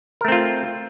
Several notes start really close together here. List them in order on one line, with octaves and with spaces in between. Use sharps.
A#4 A3 C4 F4